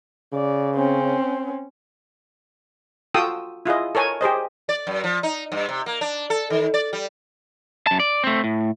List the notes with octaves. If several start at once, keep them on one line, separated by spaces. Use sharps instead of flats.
C#3 D5
C4 C#4
F4 F#4 A4 G5 D#6 E6
E4 F4 G#4 D#5
A4 A#4 C#5 G#5
G4 G#4 C5 D#5
D5
F#2
F3
D#4
G2
C3
A#3
D4
A4
D#3
D5
G3
F#2 A5
D5
A3 C4
A2